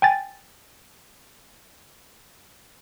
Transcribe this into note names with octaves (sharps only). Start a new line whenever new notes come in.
G5 G#5 A6